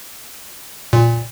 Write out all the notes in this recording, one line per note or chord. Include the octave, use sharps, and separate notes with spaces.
A#2